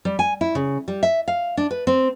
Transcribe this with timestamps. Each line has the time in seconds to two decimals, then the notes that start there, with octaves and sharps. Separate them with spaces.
0.05 G3
0.19 G#5
0.41 E4
0.55 C#3
0.88 G3
1.03 E5
1.28 F5
1.57 D4
1.71 B4
1.87 C4